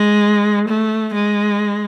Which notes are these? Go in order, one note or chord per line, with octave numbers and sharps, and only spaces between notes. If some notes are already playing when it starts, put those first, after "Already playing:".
Already playing: G#3
A3
G#3